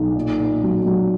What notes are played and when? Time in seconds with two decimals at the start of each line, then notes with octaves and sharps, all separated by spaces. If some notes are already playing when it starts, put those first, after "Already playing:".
Already playing: B1
0.15 A#2
0.39 A#2
0.63 F#3
0.86 F#3